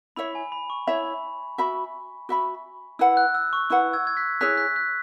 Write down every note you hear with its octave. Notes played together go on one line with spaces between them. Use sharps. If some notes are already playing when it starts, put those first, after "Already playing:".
E4 C#5 E5 B5
G#5
B5
C#6
E4 C#5 E5 B5
F#4 E5 B5
F#4 E5 B5
E4 B4 F#5 E6
F#6
E6
C#6
E4 B4 F#5 C#6
E6 G#6
G#6
F#6 B6
E4 G#4 C#5 G#5 F#6 B6
F#6 B6
F#6 B6